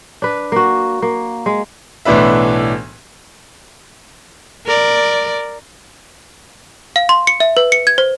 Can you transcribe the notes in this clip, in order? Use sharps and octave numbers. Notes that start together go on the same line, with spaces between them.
D4 B4
A#3 F#4
A#3
G#3
B1 A2 E3 D4 B4 E5
A#4 D5
F5
C6
C#7
E5
B4
C#7
G#6
C5